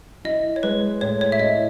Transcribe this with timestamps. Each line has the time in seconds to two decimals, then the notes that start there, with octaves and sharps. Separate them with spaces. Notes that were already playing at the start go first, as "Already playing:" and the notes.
0.25 E4 D#5
0.56 C#5
0.63 G#3 B4
1.01 A2 C#5
1.21 C#5
1.32 E5
1.39 E4 D#5